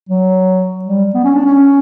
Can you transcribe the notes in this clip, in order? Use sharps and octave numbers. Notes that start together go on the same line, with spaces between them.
F#3
G3
B3
C#4
D4
C#4